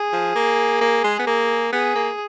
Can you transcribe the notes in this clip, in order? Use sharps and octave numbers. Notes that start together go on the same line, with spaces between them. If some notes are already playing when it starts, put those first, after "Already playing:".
Already playing: G#4
F3
A#3
A#3
G#3
B3
A#3 G#4
B3 G#4
A#3